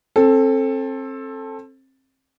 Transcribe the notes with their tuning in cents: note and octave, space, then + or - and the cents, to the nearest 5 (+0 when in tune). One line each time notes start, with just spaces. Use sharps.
C4 +30 A4 +0